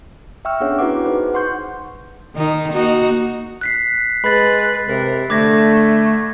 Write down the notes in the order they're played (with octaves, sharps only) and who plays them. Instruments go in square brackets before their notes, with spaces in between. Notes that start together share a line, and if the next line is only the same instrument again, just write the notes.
[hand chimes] E5 G5 C#6 E6 F6
B3 C#4 D4 G#4 C#5 F#5
E4 F#4 B4 F#5 D6
D#4 G#4 B4 C5
F#5 C6 C#6 G6
[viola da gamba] D#3 D#4
A#3 D#4 F#4
[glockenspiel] F#6 B6 C7
[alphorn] G#3 [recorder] B4 [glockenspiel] B5 A6
[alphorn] C3 [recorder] A#4
[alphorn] D3 [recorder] A3 [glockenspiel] D6 G#6 A#6